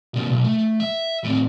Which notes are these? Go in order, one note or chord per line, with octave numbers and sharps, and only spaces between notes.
C3 A#3
B1
A3
E5
A2 C4